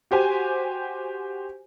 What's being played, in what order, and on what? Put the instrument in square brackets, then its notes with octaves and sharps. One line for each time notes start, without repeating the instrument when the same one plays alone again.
[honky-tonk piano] F#4 G4 C5 G#5